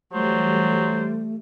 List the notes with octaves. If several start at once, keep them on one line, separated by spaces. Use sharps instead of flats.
E3 F#3 G3 A3 C5